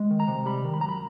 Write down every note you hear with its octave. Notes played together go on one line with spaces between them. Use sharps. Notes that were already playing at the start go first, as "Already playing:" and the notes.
Already playing: G#3
D#3
A#5
C3
G3 B5
D#3
B5
F#2 A#5
B5